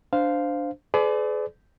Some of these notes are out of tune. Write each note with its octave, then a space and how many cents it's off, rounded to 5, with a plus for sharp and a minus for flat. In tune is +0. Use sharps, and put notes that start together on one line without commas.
D4 +0 C5 -15 F5 +0
G#4 +40 B4 +45 D5 +0